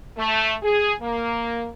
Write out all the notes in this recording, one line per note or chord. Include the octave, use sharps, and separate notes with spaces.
A3
G#4
A#3